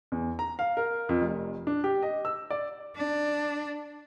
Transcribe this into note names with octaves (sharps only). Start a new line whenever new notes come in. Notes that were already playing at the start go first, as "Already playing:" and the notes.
E2
A#5
F5
A#4
F2
F1
D4
G4
D#5
E6
D5
D4